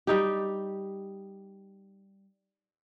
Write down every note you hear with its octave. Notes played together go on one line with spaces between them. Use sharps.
G3 D#4 G4